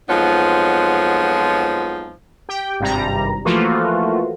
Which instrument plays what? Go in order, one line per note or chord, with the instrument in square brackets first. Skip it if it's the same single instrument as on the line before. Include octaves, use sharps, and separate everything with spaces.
[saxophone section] F2 F3 F#3 G#3 B3 D#4
[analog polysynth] G4 G5
G#1 G2 C3 G3 A#5
E3 F3 A3 A#3 F4 F#4